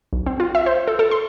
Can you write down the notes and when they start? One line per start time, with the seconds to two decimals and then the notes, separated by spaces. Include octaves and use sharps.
0.13 B1
0.26 C4
0.40 F4
0.55 E5
0.66 C5
0.88 A4
0.99 A4
1.11 C6